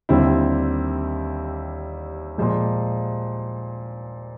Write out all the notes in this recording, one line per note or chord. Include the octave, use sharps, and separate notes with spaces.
D#2 D3 G3 C4 E4
A#2 F3 G#3